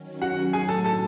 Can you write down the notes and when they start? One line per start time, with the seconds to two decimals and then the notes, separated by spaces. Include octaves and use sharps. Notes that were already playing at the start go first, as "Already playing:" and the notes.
Already playing: D#3 F#3 C#4
0.22 F#4 F#5
0.53 A2 F#3 A3 G#4 G#5
0.69 A4 A5
0.84 A4 A5